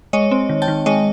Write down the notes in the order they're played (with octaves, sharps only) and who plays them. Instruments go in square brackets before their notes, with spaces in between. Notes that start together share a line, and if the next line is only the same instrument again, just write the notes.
[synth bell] G#3 C#5 D#5
C4
D#3
G5 A5
D#3
G#3 C#5 D#5